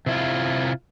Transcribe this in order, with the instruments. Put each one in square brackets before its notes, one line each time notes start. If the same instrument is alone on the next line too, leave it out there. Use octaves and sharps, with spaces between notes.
[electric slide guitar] C3 E4 F4